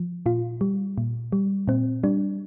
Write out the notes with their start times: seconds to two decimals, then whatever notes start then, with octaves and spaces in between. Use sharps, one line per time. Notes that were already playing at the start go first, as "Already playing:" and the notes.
Already playing: F3
0.26 A#2 F4
0.61 G3
0.98 A#2
1.32 G3
1.68 A#2 C4
2.03 G3 D4